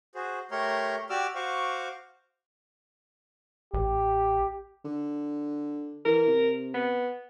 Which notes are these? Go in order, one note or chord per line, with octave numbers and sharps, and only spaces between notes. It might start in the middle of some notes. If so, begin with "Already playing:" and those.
F#4 G#4 C5
A3 G4 A#4 C#5 A#5 C6
F#4 G4 D5 D6 E6 F6
F#4 C5 F5 C#6 D6
A1 G4
D3
E3 A#4
C3
B3